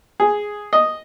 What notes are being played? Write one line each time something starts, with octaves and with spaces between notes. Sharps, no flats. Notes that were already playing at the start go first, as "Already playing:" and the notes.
G#4
D#5